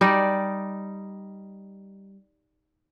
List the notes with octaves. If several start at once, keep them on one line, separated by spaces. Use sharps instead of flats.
G3 D#4 D5